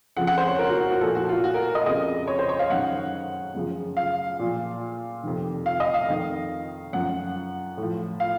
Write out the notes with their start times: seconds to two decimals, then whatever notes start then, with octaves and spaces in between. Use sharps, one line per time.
0.16 F2 C#3 F3 F#5
0.27 F#5
0.38 C5
0.48 C#5
0.59 A#4
0.69 F#4
0.80 F#4
0.90 F#4
1.01 A#2 F3 A4
1.15 F#4
1.29 F4
1.44 F#4
1.54 A#4
1.75 D#5
1.86 F2 C#3 F3 D#5
2.28 C#5
2.39 C5
2.49 C#5
2.59 F5
2.70 F#2 D#3 F#5
3.55 F#2 C#3 F3
3.97 F5
4.39 A#2 F3
5.23 F2 C3 D#3
5.66 F5
5.80 D#5
5.94 F5
6.08 F2 D#3
6.93 F#2 F3 F#5
7.77 A2
7.83 F3
8.20 F5